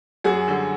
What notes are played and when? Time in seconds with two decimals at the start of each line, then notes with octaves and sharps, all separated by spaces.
0.24 F#2 F#4 G#4
0.48 D3 G3